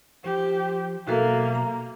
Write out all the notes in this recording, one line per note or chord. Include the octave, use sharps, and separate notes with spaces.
F3 G4 C5
B2 F#3 A#3 F#4 A4 A#4 E5
A#5